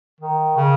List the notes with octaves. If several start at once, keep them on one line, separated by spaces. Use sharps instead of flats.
D#3
C#3